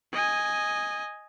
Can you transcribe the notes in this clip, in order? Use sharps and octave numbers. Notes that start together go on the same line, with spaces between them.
D#5 G#5